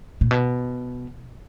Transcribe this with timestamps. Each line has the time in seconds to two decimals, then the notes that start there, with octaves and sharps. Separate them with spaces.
0.21 A#2
0.31 B2